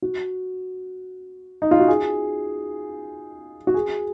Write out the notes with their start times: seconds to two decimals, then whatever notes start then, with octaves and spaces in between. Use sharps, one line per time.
0.02 F#4
1.62 D#4
1.71 F4
1.80 F#4
1.88 G#4
3.67 F#4
3.74 G#4